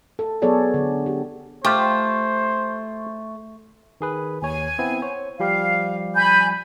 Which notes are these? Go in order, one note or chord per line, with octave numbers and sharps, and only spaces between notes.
A4
F#3 B3 G#4 A4 C#5 D5
D3 A4
G4
A3 F4 G4 C5 C#6
D#3 G#4 B4
D#2 C#5 G#5
B3 C4 E4
C5 C#5
F3 G3 G4 F5
G#5 B5 G6